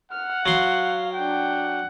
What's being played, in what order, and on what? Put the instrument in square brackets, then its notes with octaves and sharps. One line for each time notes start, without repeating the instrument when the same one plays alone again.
[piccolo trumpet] F#5 [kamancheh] F6
[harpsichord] F#3 C6 [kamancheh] F5
[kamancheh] D4 G5 [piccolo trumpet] F#5